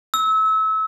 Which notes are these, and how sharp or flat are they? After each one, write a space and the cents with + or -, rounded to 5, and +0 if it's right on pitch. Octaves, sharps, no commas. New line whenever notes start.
E6 -30